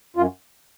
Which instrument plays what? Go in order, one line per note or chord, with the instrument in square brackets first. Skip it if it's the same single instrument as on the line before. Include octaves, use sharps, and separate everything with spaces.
[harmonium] F#2 F4